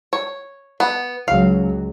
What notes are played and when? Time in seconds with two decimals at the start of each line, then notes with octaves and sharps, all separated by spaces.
0.13 C#5
0.80 B3
1.28 C#2 F#3 F5